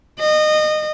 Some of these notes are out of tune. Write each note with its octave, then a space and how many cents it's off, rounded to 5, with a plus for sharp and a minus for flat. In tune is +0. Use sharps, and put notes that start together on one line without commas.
D#5 -25